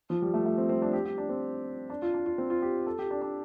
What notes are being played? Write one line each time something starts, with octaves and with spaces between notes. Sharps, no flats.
F3
G3
A3
A3
C4
C4
D4
G4
G4
D4
C4
D4
F4
D4
F4
C4
F4
G4
A4
G4
D4
D4